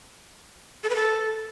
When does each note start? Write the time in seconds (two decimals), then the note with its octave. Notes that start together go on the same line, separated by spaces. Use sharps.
0.84 A4
0.90 B4
0.96 A4